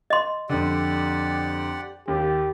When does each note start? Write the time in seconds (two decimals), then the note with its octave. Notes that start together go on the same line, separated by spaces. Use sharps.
0.10 D#5 C6
0.49 F2 D3 G4 D5 F#5
2.08 D#2 G4